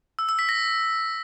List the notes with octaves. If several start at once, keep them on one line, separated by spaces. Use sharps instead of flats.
E6
E6
B6
A#6